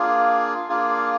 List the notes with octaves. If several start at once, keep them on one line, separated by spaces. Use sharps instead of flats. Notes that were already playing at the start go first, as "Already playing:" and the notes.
Already playing: A#3 D4 F4 G#4
A#3 D4 F4 G#4